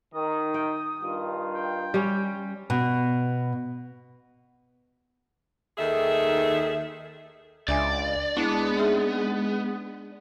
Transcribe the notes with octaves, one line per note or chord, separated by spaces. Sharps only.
D#3 D#6
G5
G2 D#3 F4
G5
G3 C#4
B2
D#2 D#3 G#4 A4 E5
C#2 D4 D5 E5 G#5
G#3 B3 D4 E4
D#4 G#4 E5